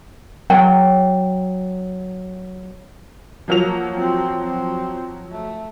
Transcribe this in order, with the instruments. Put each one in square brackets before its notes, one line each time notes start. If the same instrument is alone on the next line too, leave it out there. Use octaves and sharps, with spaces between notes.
[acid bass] F#3 [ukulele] G5
[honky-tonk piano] F3 F#3 F7 [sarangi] A#3
[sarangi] C4
C4
A3